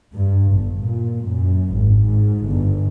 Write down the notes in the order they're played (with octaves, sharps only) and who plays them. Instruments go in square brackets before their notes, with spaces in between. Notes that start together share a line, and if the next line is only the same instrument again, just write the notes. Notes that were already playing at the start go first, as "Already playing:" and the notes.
[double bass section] G2
G1
A#2
F#2
G#1
G#2
G1